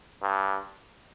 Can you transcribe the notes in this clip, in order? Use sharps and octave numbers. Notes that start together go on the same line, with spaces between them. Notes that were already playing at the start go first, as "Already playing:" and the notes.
G2